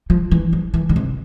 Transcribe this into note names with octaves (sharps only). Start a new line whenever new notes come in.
F3
E3
F3
E3
D3
C3